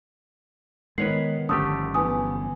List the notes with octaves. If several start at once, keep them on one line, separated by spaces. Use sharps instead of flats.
D#3 G#3 B3 D#4 B4 C#5 F#5 C7
G1 D3 F3 A3 C#4 G4 D#6
E3 B3 G#5 D#6